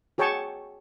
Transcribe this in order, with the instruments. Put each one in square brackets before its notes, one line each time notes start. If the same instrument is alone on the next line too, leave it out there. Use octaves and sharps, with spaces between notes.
[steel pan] F#4 G#4 C#5 G5 A5 C#6